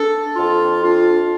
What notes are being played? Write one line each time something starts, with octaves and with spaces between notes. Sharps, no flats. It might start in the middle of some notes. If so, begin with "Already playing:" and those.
Already playing: D4 A4
F2 F4
D4 F4